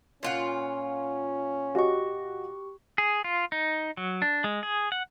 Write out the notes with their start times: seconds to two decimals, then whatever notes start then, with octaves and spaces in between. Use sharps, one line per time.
0.23 A#2 C#4 F4 F#5
1.75 F#4 G4 D#5 C#6
2.98 G#4
3.24 F4
3.52 D#4
3.97 F#3
4.22 D4
4.44 G#3
4.63 G#4
4.92 F#5